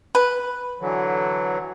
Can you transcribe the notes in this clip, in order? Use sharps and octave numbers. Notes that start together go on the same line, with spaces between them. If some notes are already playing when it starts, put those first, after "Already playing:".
B4
D3 E3 F#3